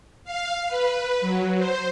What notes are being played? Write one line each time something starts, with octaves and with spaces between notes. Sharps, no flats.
F5
B4
F#3
C5